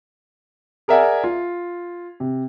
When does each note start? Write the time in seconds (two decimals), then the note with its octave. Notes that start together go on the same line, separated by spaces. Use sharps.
0.88 G#4 A#4 D5 E5 F#5 G#5
1.24 F4
2.20 C3